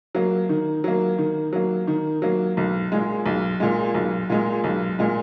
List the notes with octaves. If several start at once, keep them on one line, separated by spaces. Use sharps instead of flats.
F#3 A#3
D#3
F#3 A#3
D#3
F#3 A#3
D#3
F#3 A#3
B1
A#2 G#3
B1
A#2 G#3
B1
A#2 G#3
B1
A#2 G#3